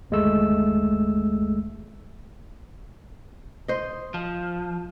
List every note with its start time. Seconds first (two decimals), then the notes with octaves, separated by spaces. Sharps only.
0.10 G1 D#2 G#3 A3 E6
3.68 C5 D#5
4.14 F3